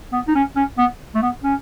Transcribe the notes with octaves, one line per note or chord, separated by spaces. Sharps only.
B3
D#4
C#4
C#4
B3
A3
B3
C#4